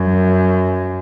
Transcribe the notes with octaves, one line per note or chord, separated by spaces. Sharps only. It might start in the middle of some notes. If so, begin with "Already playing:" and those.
Already playing: F#2